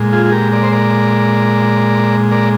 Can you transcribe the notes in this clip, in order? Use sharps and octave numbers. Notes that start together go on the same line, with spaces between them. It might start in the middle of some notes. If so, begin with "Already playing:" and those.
Already playing: A#2 G#3
F4 G#4
G#4
G4 A#4
A#4 D5
C5
A#4 D5
A#4 D5